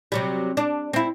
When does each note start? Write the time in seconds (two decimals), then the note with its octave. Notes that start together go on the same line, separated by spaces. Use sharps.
0.12 C3 F#3 G3
0.57 D4
0.93 C4 E4